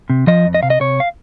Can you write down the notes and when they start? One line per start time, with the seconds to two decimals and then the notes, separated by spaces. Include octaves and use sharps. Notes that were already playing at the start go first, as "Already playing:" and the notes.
0.10 C3
0.27 F3 D#5
0.46 F2
0.54 D#5
0.63 C3 F5
0.70 D#5
0.80 C3 C#5
1.00 F5